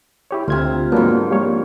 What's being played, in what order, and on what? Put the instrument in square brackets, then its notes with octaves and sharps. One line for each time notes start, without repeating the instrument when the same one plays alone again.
[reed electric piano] E4 G4 C#5
[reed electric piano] D2 G#6 [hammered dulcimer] C3 F4
[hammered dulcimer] G#2 F3 D4 [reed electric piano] F#3 A#3 B3
[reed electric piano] G3 A#3 C#5